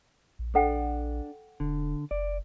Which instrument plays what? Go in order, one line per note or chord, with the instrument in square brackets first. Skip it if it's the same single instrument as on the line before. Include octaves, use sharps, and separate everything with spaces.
[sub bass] A#1
[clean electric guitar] D4 [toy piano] A4 F#5 G5
[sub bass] E1 [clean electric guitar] D3
[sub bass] F#1 [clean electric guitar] D5